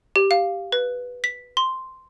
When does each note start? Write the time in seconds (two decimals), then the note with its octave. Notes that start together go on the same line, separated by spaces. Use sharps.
0.16 G4
0.31 F5
0.72 B4
1.24 B6
1.57 C6